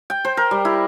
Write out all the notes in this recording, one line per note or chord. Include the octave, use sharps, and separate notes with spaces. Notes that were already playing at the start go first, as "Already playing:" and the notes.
G5
C5
A#4
G3
E4